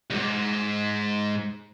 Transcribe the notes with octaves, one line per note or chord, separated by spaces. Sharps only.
C#2 G#2